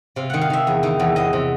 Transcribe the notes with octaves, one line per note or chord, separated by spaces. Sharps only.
C3 F5
D#3 F#5
F5
D#3 E5
E2
D#3
E2
E2 D#5
C3